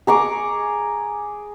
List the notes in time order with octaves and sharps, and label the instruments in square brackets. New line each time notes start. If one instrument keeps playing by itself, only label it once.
[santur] G#4 A#5 C#6 D6